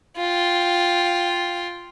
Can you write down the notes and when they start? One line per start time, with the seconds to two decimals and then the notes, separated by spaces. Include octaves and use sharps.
0.17 F4 G5